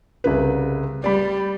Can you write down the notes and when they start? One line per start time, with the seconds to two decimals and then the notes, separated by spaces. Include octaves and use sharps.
0.24 C2 C#3 B4
1.04 G3 D5 B5